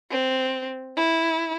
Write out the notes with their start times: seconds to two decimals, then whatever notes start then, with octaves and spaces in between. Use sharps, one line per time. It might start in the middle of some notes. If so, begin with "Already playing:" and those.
0.11 C4
0.97 E4